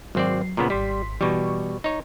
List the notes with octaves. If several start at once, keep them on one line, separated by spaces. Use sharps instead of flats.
G#1 F#3 C4 D5 C7
A#2 C#3 B3
G#1 G3 C6 B6
B2 E3 G3 C#6
D#4 C#5